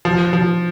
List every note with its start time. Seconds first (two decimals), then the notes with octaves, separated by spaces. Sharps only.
0.05 F3
0.33 F3